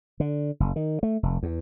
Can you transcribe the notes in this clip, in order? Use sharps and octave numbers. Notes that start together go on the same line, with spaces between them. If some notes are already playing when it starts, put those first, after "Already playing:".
D3
F#1
D#3
A3
F1
E2